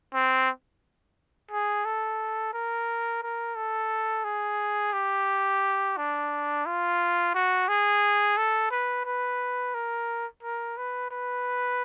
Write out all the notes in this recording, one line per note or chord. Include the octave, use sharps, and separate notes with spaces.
C4
G#4
A4
A#4
A#4
A4
G#4
G4
D4
F4
F#4
G#4
A4
B4
B4
A#4
A#4
B4
B4